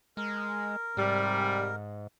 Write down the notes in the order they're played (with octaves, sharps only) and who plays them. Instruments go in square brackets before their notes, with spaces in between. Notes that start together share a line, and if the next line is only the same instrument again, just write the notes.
[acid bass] G#3 [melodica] A#4
[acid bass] G#2 [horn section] C3 G3